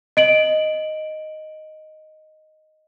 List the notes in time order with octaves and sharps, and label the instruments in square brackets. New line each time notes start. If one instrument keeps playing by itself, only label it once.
[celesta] D#5 D7 F#7